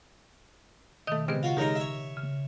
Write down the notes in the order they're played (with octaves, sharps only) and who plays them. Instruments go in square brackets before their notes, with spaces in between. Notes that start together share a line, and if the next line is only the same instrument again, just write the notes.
[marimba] B2 D#3 [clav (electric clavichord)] A3 D#5
[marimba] C#3 B3 B4 [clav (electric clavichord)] G#3 C4 G4
[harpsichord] F4 F#4
[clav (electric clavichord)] D#3 F#3 D#4 [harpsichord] G#3 A#4 D#5 [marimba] G4
[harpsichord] C#5 E5
[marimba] C#3